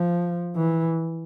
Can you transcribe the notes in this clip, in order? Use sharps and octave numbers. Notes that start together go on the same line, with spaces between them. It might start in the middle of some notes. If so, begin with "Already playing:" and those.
Already playing: F3
E3